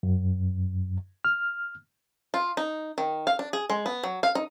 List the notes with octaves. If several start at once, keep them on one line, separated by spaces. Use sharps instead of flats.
F#2
F6
F4
D#4
D#3
F5
D4
G#4
G#3
B3
F#3
F5
D#4